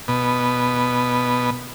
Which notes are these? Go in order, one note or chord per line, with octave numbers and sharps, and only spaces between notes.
B2